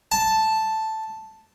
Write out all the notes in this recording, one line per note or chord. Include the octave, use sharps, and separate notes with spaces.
A5